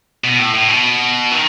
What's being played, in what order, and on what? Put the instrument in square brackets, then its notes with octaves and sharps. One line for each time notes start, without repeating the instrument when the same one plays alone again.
[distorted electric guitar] B2
A2
A2
B2
D#3